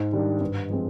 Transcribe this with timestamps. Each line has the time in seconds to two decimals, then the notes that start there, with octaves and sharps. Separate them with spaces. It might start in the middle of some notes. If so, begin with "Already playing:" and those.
Already playing: G#2
0.12 D#3 G3 D4
0.41 G2
0.70 F3 G#3 C4